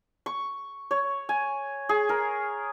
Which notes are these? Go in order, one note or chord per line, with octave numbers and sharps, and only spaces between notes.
C#6
C#5
G#5
G#4
A#4